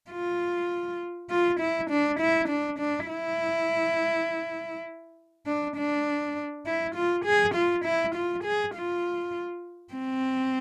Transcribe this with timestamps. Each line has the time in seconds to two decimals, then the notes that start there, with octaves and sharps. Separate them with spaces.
0.11 F4
1.30 F4
1.60 E4
1.90 D4
2.20 E4
2.49 D4
2.79 D4
3.09 E4
5.46 D4
5.77 D4
6.66 E4
6.95 F4
7.25 G#4
7.54 F4
7.85 E4
8.15 F4
8.44 G#4
8.75 F4
9.94 C4